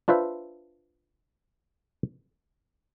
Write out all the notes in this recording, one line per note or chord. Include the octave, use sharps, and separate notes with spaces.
D4 F4 B4 C5 E5